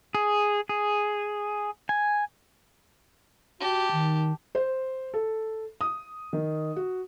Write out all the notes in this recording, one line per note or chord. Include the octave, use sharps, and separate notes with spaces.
G#4
G#4
G#5
F#4 G4 A5
D#3
C5
A4
D#6
D#3
F#4